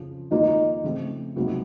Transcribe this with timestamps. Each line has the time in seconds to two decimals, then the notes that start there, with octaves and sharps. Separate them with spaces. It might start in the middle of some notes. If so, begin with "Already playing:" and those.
Already playing: F2 C#3 F3
0.31 F2 D#3 A#3 D#4 F4 A#4
0.83 C#3 F3 A3 C4
1.36 C#2 C3 F#3 A#3 D#4